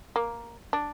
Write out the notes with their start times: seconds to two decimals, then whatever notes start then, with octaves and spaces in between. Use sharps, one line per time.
0.16 A#3
0.73 D4